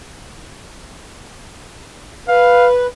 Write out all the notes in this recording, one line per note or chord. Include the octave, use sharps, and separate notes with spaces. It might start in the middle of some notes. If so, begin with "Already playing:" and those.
B4 F5